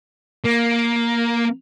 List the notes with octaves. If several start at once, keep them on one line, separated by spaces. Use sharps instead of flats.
A#3